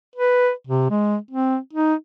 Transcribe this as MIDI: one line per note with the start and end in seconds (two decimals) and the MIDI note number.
0.15 0.50 71
0.67 0.87 48
0.90 1.16 56
1.31 1.57 60
1.73 1.94 63